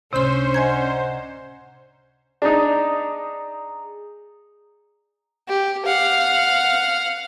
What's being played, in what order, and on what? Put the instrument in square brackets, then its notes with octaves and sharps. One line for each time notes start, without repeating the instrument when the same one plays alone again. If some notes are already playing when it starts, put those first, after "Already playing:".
[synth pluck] C#2 A2 D4 [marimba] C3 C6 [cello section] C#4 [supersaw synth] C5
[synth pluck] D5 F#5 A#5 [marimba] D#5 G#5 G#6
[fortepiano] D4 D#4 [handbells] G#4 A#5 D#6
[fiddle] G4
F5 F#5